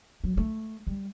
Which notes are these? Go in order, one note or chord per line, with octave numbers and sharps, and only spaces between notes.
F#3
A3
G3